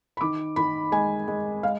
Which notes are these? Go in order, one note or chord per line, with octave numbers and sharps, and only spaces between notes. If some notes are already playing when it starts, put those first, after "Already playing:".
B5
D#3 D6
D#3 B5
G#3 G#5
G#3
G#3 F5